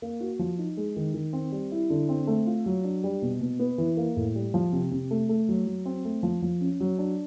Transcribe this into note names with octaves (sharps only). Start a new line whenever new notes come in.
A#3
F#4
F3
D#4
G#3
D#3
D#3
C4
G3
E4
D3
C4
A3
F4
F#3
D4
G3
B2
B2
B3
E3
A#3
A2
G3
F3
C3
C3
A3
A3
F#3
F#3
C4
A3
F3
F3
C#4
F#3
D4